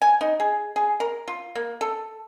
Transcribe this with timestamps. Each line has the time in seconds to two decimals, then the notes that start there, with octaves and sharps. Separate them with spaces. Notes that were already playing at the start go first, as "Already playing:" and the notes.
0.02 G#5
0.21 D#4
0.40 G#4
0.76 G#4
1.00 A#4
1.28 F4
1.55 A#3
1.81 A4